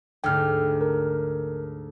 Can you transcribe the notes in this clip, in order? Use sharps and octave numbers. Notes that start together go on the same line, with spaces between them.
D2 G#2 D3 G5 F6
A#4